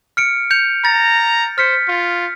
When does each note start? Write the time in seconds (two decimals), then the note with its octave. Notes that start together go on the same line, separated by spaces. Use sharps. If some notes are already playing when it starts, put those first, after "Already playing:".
0.17 F6 C#7 D7
0.51 G6 C#7 F7
0.85 A#5 A6
1.58 C5 F6 B6 C#7
1.88 F4